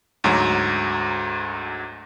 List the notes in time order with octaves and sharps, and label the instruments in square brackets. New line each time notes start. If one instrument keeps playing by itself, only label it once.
[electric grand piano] D2 G#2 F#3 A#5